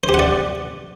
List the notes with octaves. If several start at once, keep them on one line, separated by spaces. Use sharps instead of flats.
C5
G4
F#5
D5